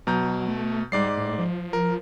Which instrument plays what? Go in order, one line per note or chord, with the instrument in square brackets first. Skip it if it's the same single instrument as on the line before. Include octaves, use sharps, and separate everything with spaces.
[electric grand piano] B2 A#5 G6 [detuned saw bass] F#3
[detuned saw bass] A3
[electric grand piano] G#2 D5 C7 [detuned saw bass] G3
[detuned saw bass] A2
F3
[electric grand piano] A#4